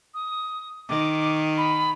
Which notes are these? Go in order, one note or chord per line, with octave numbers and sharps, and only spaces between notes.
D#6
D#3 D6
B5